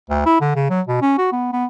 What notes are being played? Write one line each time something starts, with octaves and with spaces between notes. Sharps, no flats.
D2
E4
D3
C#3
F#3
B2
C#4
F#4
B3
B3